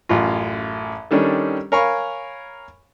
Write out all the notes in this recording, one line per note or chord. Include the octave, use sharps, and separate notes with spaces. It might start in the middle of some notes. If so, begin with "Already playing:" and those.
A1 F#2 F4
D#3 G3 C#4 D4 A4
A#4 C#5 F5 G#5 B5 C#6